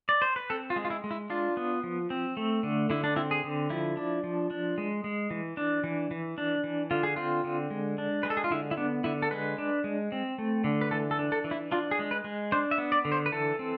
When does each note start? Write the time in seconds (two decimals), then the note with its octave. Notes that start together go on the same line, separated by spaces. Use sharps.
0.09 D5
0.22 C5
0.36 B4
0.50 C4 A4
0.70 F4
0.76 G#3
0.85 F4
0.90 E4
1.04 G#3
1.11 E4
1.30 D4 F4
1.57 B3
1.84 F3
2.10 C4
2.37 A3
2.63 D3
2.90 D3 E4
3.04 D4
3.16 C4 E4
3.31 G#4
3.44 D3
3.70 F3 E4
3.97 D4
4.24 F3
4.51 D4
4.78 G#3
5.04 G#3
5.31 E3
5.57 D4
5.84 E3
6.11 E3
6.38 D4
6.64 E3
6.91 D3 F4
7.03 G#4
7.16 C4 F4
7.44 D3
7.70 G#3
7.98 D4
8.23 G#3 B4
8.30 A4
8.37 G#4
8.44 F4
8.51 D3 E4
8.71 E4
8.77 B3 D4
9.04 D3 E4
9.22 A4
9.31 G#3 B4
9.58 D4
9.84 G#3
10.12 C4
10.38 A3
10.64 D3
10.81 B4
10.91 E3 A4
11.11 A4
11.19 D4
11.32 A4
11.44 E3
11.51 E4
11.72 D4 F4
11.91 G#4
11.99 G#3
12.11 B4
12.24 G#3
12.52 D4 C5
12.71 E5
12.78 B3
12.92 D5
13.05 D3
13.12 C5
13.26 B4
13.32 E3 A4
13.59 C4